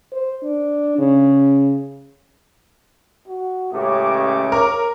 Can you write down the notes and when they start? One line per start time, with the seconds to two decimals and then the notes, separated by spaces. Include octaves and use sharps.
0.12 C5
0.43 D4
0.99 C#3
3.28 F#4
3.73 C#2 A2 C#3 G4 D6
4.52 A#4 C#5